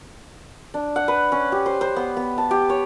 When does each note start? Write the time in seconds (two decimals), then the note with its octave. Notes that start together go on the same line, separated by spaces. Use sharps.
0.74 D4
0.96 F#5
1.08 B4
1.32 C#4
1.52 G4
1.66 C5
1.81 C5
1.96 B3
2.17 B3
2.38 A5
2.51 G4
2.70 C#5